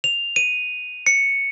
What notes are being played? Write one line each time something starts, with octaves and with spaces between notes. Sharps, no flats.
F7
D#7
C#7